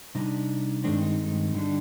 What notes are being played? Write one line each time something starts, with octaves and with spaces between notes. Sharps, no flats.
C3 G3 D4 D#4
G2 D#3 G#3 C4 D4
D#4
D#4
G2 D3 G3 D4